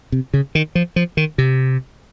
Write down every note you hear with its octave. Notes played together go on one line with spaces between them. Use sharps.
C3
C#3
D#3
F3
F3
D#3
C3